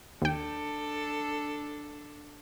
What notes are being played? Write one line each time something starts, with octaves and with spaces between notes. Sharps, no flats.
D#2 D4 A4 G5